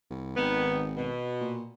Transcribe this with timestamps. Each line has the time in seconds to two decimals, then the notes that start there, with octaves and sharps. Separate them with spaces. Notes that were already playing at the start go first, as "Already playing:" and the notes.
0.10 C2
0.37 G#1 D#3 B3
0.95 B2
1.41 A#2